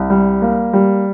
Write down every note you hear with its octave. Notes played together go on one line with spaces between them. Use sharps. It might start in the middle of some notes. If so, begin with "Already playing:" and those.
Already playing: C2
G3
A#3
G3